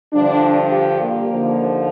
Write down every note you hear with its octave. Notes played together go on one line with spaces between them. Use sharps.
G2 D3 F3 D4
G4
A#3
D#2 D3 F3